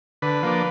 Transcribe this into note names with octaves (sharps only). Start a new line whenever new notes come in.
D3 B4
F3 A#3 D4